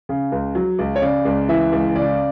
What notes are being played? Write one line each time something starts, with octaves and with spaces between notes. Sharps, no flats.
C#3
C#2
F#3
C#2
C#5
C#3 D5
C#2
E3 E5
C#2
C#3 D5